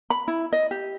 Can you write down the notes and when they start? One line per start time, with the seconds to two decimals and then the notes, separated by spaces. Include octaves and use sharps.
0.10 B5
0.28 E4
0.52 D#5
0.71 G4